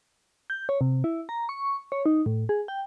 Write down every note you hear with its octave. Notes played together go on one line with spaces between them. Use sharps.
G6
C#5
C3
E4
A#5
C#6
C#5
D#4
A2
G#4
G5